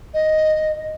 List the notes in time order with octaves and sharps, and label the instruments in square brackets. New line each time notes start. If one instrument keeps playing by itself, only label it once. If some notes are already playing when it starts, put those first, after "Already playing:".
[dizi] D#5